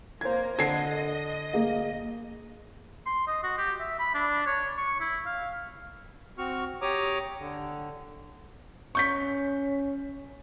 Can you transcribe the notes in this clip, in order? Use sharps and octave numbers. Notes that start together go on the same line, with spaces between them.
A#3 C5 G#6
D3 D4 D#5 G#6 C7
A#3 G#4 F5
C6
D#5
F#4
G4
E5
B5
D4
C#5
C#6
E4
F5
C4 F#4 C#6 F6
G4 C#5 A#5 D6 D#6
D3
C#4 C#6 G6 B6